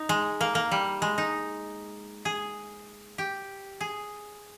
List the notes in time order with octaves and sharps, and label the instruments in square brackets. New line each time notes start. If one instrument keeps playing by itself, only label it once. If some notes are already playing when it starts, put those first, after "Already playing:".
Already playing: [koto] D#4
G#3
A#3
A#3
G3
G#3
D#4
G#4
G4
G#4